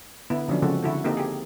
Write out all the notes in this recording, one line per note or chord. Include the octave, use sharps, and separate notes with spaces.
D3 B3 E4
D3 F3 F#3 C#4 D4
C#3 F3 G#3 C4 F#4 A4
D3 E4 F#4 A4
A#3 C4 D#4 G4 A4
G4 G#4